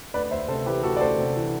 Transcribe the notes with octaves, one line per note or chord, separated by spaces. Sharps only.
D2 B4 D5
D2 C5 E5
C3 A4 C5
E3 G4 B4
D2 F#4 A4
D5
D2 A4 C5
C3
E3